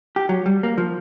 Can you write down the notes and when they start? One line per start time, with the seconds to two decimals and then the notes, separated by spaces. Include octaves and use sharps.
0.16 G4
0.29 F#3
0.46 G3
0.63 A#3
0.78 F3